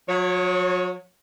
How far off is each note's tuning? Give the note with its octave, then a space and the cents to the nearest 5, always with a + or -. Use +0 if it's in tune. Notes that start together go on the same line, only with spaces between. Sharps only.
F#3 -40 C#5 +0